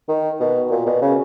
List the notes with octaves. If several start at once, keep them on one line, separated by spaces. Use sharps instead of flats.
D#3
B2
A#2
B2
C#3